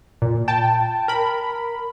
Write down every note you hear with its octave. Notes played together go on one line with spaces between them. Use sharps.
A#2
G5 A5
A#4 B5